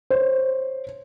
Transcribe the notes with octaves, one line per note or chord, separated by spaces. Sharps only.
C5 C#5